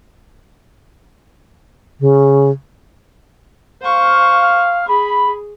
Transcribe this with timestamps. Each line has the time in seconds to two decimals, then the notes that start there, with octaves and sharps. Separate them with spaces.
2.00 C#3
3.82 C5 F5 C#6
4.87 G#4 B5